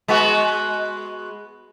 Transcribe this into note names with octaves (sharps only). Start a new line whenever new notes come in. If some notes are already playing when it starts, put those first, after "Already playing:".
G#3 B3 F#4